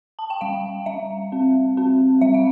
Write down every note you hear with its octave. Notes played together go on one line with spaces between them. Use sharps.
A5
G5
G3 F5
G3 E5
C4
C4
G3 E5
F5